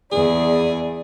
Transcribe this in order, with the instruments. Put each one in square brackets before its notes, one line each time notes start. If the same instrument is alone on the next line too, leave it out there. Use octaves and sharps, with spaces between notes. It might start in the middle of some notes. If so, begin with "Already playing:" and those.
[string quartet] E2 D5 [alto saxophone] G#4